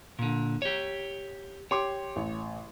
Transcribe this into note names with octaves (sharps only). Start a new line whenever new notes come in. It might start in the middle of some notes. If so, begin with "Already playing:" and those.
A#2 D3
G4 C#5
G4 C#5 C6 D6
A1